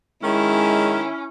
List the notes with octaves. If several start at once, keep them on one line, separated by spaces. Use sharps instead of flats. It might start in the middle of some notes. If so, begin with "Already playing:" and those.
D#3 G#3 C#4 E4